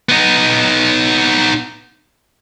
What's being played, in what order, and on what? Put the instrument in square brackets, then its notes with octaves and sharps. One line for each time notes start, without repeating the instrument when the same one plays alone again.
[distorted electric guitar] B3 D#4